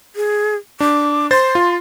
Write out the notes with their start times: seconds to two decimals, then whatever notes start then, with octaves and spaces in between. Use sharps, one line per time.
0.16 G#4
0.80 D4 D6
1.31 C5 C6 A6
1.55 F4